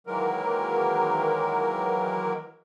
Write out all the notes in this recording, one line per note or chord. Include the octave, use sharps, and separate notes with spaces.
D#3 E3 F#3 G#3 A#3 A#4